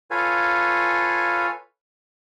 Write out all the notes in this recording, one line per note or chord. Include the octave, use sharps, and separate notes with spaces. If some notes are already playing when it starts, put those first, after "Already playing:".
F4 A4 B4 C#5 F5 G#5